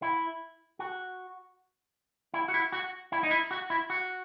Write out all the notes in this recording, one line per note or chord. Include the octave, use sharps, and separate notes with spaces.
E4
F#4
E4
F#4
E4
F#4
E4
D#4
E4
F#4
E4
F#4